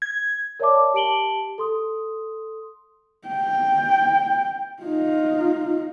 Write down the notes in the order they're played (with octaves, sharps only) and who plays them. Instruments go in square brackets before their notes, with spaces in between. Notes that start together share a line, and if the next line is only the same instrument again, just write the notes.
[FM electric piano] G#6
[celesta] A#4 C#5 D5 E5 A5 D6
G4 A5 D7 F#7 G7
A4 C6 D#6
[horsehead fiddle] G5
D#4 F4